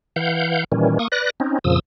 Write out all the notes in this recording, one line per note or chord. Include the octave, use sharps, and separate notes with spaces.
E3 F5 F#5 G6
A#2 D#3 E3 G3 C#4
A#3 C#6 D#6
B4 D5 F#6 A#6
C4 C#4 D#4
F2 A#2 C#3 F3 D#6 E6